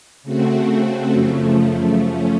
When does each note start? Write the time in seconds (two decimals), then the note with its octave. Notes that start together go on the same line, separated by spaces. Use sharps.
0.23 C#3 A3 C4 F#4
1.13 F#2 C#3 F3 A3
2.02 F3 A3 C#4